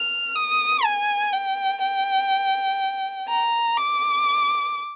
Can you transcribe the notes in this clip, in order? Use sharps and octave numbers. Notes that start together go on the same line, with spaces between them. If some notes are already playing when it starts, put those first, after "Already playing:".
Already playing: F6
D#6
G#5
G5
G5
A#5
D6